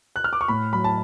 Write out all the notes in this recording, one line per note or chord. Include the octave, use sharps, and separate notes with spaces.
F#6
F6
D6
C#6
A2 B5
F#3 B5
A5